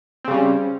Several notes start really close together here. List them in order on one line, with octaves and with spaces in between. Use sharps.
C4 C#3 G3 C#4